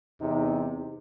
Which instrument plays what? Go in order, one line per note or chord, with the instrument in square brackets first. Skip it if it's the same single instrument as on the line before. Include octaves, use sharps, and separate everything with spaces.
[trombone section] E2 C3 D#4